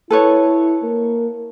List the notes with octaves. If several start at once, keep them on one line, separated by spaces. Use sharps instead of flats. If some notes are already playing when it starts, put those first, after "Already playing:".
E4 A4 B4 C#5
A#3